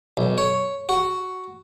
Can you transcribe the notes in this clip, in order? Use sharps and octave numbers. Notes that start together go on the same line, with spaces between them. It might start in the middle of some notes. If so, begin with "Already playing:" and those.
B1
C#5
F#4